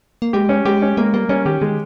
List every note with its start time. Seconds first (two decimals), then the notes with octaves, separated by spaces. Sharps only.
0.22 A#3
0.33 G#3 G4
0.49 C#4
0.65 G#3 G4
0.82 C#4
0.97 G#3 A#3
1.14 G3 A#3
1.29 G3 C#4
1.46 D#3 G4
1.61 D#3 G#3